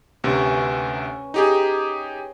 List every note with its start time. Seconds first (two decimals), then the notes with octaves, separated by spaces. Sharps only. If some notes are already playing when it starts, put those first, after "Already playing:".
0.24 D2 C3 C#4 B4 C#5
1.34 D#4 G4 G#4